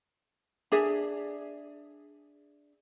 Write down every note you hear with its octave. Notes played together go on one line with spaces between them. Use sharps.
D4 G#4 E5